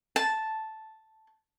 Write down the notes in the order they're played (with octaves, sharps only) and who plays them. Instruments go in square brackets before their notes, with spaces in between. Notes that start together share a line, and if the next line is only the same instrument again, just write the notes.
[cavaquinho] A5